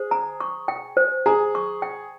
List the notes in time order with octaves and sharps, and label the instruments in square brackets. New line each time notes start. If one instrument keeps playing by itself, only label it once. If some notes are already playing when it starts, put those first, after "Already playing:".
Already playing: [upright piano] G#4 [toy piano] C5
[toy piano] A#5
C#6
G5
C5
[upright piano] G#4 [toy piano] A#5
[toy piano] C#6
G5